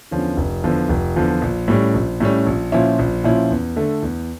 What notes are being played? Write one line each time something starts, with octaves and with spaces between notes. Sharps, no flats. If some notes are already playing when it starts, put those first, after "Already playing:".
E2 D3 F3 C#4
F1
E2 D3 F3
F1
E2 D3 F3
A#1
A2 G3 C#4
A#1
A2 G3 C#4
A#1
A#2 F3 C#4 E4
A#1
A#2 F3 C#4 E4
E2
D3 A3
E2